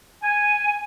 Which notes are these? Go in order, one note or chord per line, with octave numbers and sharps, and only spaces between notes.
G#5